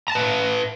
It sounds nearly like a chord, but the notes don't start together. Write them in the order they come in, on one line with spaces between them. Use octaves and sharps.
A#5 A5 B4 E5